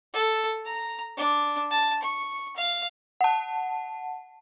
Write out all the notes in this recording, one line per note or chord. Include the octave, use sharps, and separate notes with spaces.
A4
A#5
D4
A5
C#6
F5
F#5 A5